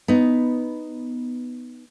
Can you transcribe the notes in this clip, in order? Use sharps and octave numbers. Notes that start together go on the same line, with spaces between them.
B3 D#4